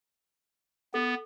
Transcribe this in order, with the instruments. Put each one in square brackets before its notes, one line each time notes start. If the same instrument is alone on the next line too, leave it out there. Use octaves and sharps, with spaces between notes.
[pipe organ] B3 [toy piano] A4